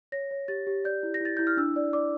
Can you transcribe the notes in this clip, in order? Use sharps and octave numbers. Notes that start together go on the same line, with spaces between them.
C#5 A#6
C#5
G4 A6
G4
D5 G6
E4
A#6
E4 A6
E4 G6
F6
D4 E6
D5
D5 D6